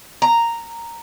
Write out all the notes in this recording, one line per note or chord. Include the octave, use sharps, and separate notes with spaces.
A#5